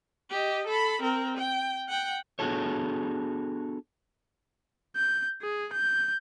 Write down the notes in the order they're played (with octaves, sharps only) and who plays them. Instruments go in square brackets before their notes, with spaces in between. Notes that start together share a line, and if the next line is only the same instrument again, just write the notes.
[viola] G4 D#5
A4 B5
C4 A#4
G5
F#5 G5
[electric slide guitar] B3 D4 F#4 G#4 A4 C#5
[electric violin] G6
G#4
G6